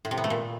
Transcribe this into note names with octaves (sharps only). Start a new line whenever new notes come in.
A2
C3
B3
A3
A#2